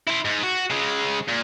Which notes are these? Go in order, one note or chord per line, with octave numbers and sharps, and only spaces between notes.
E4 C5
G#2
F#4
C#3 G#3
A#2